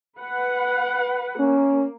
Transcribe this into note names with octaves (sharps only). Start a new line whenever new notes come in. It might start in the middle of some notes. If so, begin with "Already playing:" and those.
B4 F#5
A#3 C#4